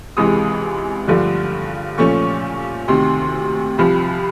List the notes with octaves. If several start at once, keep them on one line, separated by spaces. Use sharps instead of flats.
C#2 C3 E3 G#3 D#6
G2 D3 F3 A3
A#2 F3 A3 C#4 C#6
D2 C3 D#3 C6
C2 C3 F3 B5